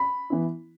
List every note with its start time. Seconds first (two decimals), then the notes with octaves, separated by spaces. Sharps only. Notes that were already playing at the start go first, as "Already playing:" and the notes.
Already playing: B5
0.30 E3 B3 E4